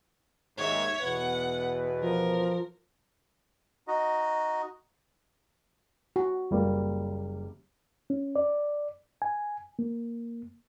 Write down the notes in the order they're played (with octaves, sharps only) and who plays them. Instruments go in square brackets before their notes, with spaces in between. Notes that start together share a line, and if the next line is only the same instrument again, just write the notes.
[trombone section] D#2 G#2 [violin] C#5 E5
[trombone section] E2 B2 B4 [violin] F#5
[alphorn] F3 [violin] A#4
[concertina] D#4 F#4 D#5
[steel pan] F#4
[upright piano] F#1 G3 A#3
[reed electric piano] C#4
D5
G#5
A#3